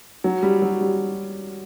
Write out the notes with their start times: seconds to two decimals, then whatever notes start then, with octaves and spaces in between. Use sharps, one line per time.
0.24 F#3
0.43 G3
0.62 F#3
0.81 G3